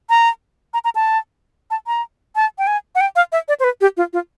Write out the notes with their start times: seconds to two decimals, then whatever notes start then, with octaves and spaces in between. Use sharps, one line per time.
0.10 A#5
0.74 A#5
0.84 A#5
0.95 A5
1.71 A5
1.87 A#5
2.36 A5
2.59 G5
2.67 G#5
2.95 F#5
3.01 G5
3.16 F5
3.32 E5
3.48 D5
3.60 C5
3.64 B4
3.81 G4
3.97 F4
4.13 F4